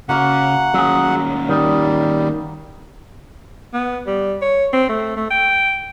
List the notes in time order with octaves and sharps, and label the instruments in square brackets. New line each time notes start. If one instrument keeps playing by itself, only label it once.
[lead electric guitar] C#3 [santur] A#3 F#4 F5 [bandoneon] F#5
[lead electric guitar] D#2 C#4 [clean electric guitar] F#3 G#4
[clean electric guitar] D#3 [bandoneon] G3
[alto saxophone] B3
G3
C#5
C4
A3
A3
G5